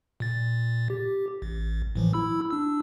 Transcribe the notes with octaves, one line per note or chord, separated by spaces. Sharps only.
A#2 A6
G4
A1
A2 E3 F3
E4 B5 E6
D4 E6